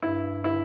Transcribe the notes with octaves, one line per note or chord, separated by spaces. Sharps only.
G2 E4
E4